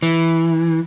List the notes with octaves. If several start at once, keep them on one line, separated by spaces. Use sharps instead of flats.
E3